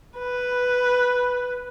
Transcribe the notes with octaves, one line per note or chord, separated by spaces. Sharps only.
B4